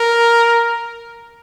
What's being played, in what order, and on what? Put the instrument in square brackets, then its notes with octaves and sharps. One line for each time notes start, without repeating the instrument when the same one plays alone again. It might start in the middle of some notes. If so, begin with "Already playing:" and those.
Already playing: [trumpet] A#4